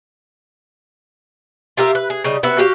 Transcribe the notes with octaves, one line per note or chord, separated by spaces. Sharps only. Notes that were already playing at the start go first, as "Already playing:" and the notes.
F4 G4 A#4 E5
B4
G#4
C#3 G3 D#4
C3 B3 F#4 E5
F#4 G4 F5